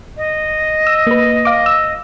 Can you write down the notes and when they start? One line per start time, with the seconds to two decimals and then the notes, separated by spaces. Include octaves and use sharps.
0.17 D#5
0.87 E6
1.07 A#3 B4
1.45 F5 D6
1.66 E6